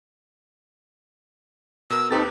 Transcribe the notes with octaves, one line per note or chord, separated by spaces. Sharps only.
B2 A#4 E6
D#2 C4 D#4 G4 A4 B4 A6